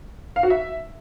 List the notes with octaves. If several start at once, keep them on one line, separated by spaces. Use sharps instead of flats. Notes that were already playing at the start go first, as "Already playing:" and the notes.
F5
F#4
E5